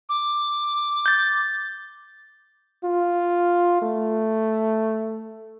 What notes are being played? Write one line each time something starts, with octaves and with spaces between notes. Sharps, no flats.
D6
G6 A6
F4
A3